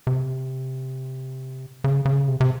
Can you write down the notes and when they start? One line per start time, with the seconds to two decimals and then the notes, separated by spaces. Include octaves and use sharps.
0.07 C3
1.84 C#3
2.05 C#3
2.28 C3
2.40 C3